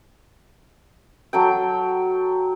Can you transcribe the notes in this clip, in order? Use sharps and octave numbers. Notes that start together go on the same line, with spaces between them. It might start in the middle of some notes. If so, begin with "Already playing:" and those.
F#3 A4 G5